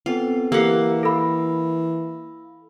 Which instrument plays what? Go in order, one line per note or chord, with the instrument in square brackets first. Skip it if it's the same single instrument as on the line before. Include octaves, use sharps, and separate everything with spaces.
[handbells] B3 C4 A4 [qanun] F4
[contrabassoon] E3 [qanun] A#3 F#5 [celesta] G4 A4 F5 [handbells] E6
[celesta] A4 B5 [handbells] F5 E6 A#6